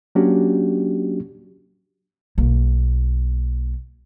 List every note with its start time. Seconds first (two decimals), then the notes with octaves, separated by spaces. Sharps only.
0.15 F#3 A#3 C#4 D4 F#4 G4
2.38 B1 A#3